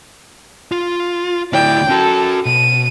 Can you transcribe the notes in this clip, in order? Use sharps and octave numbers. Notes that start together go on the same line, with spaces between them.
F4
D2 E4 D5 G5
C#4 F#4 A4
B2 D#7